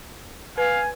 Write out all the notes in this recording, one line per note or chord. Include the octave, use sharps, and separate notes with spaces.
B4 F5 G#5